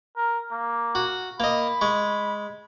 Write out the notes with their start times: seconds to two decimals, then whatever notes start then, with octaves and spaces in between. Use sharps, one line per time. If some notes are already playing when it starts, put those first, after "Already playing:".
0.17 A#4
0.52 A#3
0.95 F#4
1.40 A#3 D#5 B5
1.81 G#3 C#6